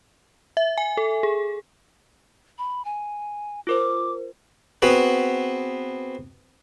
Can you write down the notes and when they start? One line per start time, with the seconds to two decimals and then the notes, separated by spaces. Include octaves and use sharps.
0.57 E5
0.78 G#5
0.97 A4
1.23 G#4
2.58 B5
2.85 G#5
3.67 F4 A#4 C5 D6
4.82 B3 C4 F#4 G#4 B4